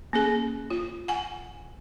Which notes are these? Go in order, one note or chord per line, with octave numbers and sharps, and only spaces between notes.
A#3 C#4 G#4
F4
F#5 G#5